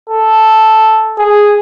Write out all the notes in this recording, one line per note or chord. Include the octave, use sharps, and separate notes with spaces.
A4
G#4